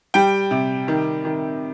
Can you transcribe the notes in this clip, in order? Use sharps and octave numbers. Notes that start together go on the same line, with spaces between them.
G3 G5
C3
D#3
D#3